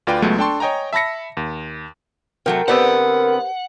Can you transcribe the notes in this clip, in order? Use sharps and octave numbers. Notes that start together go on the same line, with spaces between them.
D2 F4 B4 D5 G5
C#2 F#3 G#3 A3 B3
D4 A4 G5 A5 C6 C#6
C#5 D#5 G5 G#5 A#5
E5 A5 B5 A#6 C#7
D#2
C3 F#3 A3 A#4 G5
D3 B3 C4 G4 B4 C5 F#5